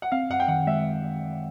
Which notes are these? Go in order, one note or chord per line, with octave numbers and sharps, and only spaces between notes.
F#5
C4 F5
F#2 F#5
G5
D#3 F#5
G#3 E5